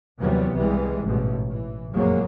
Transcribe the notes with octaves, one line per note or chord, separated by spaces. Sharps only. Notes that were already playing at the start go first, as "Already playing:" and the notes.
D#2 C3 E3 F#3 G3 B3
C2 E3 G3 G#3
A1 G#2 B2
E3
F#1 F2 A#2 F#3 G#3 A#3